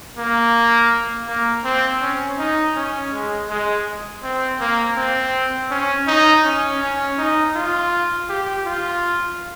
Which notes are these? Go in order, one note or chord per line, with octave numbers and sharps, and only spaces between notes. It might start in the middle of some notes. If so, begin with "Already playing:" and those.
A#3
A#3
C4
C#4
D#4
C#4
G#3
G#3
C4
A#3
C4
C#4
D#4
C#4
C#4
D#4
F4
G4
F4